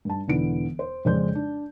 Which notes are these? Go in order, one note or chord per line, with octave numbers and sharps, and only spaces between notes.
G2 A5
E1 D3 E3 B3 D7
C5
F2 C#3 G#3 C5 D5 G6
D4